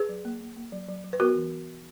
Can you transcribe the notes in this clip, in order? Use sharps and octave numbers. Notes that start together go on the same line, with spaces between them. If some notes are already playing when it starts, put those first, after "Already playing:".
Already playing: G#4 B4
F#3
A#3
A#3
A#3
F#3
F#3
F#3
B4
B3 F#4 A#4
E3